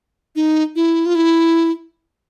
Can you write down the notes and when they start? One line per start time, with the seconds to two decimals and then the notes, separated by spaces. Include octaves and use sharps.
0.36 D#4
0.76 E4
1.06 F4
1.15 E4